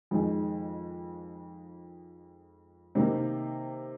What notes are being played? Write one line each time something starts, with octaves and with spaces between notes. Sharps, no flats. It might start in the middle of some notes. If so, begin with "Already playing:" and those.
F2 D#3 G#3 D#4
C3 D#3 A#3 D#4